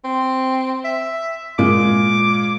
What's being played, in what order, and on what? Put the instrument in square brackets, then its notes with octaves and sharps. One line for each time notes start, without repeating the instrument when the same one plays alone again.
[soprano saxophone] C4
E5
[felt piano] A#2 G#3 [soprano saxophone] D6